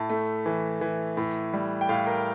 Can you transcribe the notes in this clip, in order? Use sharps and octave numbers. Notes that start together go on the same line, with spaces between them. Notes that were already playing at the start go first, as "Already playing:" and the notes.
Already playing: A2 A5
A3
E3
E3
A2
G3
G5
A2 F5
A#4